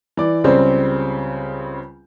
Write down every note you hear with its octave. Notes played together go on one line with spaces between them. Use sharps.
E3 D5
C#2 C#3 G3 C4 C5